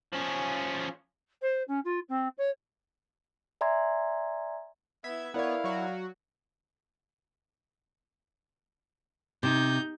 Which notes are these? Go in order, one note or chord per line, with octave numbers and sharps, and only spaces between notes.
F3 C#4
C5
C#4
F4
C4
C#5
D5 E5 G#5 A#5 C6 G#6
B3 E4 E5 G#6
B3 E4 A#4 C#5 D5 F5
F#3 F#4
C3 D#4 G6